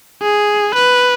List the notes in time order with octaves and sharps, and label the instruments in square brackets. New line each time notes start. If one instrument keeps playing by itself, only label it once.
[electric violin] G#4
B4